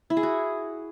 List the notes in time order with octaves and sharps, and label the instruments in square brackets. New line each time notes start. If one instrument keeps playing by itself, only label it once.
[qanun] E4
G#4
F#4